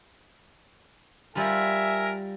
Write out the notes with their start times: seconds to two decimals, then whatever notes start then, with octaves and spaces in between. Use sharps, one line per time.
1.35 G3 F4 A#4 E5 G#5